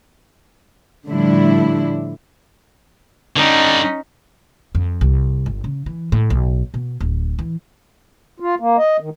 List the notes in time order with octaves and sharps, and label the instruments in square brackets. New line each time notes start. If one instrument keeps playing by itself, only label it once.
[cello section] A2 D3 F3 G3 D4 E4
[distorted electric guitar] D3 G3 [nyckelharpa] C#4 D#4
[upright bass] F2
C2
G1
C#3
E3
A2
B1
B2
D1
E3
[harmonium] F4
A#3
D#5
D#3